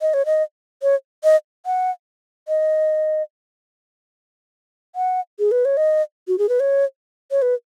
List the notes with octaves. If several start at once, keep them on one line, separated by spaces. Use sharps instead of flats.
D#5
C#5
D#5
C#5
D#5
F#5
D#5
F#5
G#4
B4
C#5
D#5
F#4
G#4
B4
C#5
C#5
B4